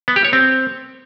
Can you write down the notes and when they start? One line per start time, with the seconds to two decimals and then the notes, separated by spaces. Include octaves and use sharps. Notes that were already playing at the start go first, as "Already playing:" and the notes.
0.08 B3
0.16 G4
0.25 C#5
0.33 C4